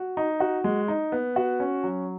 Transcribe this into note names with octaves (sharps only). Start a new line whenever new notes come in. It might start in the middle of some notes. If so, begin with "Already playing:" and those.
Already playing: F#4
D#4
F#4
G#3
D#4
B3
F#4
C#4
F#3